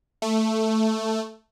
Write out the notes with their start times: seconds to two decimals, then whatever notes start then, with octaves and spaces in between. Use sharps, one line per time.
0.22 A3